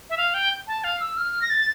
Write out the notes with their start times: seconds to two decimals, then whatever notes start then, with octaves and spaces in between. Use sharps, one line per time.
0.10 E5
0.18 F5
0.34 G5
0.67 A5
0.84 F5
1.00 E6
1.17 F6
1.41 A#6
1.50 A6